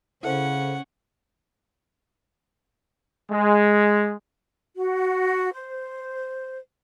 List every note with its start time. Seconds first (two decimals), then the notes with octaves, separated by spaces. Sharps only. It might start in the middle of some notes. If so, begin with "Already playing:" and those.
0.23 C#3 C#4 E4 A4 C5 F#5
3.30 G#3
4.76 F#4
5.53 C5